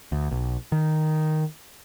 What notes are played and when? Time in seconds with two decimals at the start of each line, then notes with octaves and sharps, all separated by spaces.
0.12 D2
0.31 B1
0.72 D#3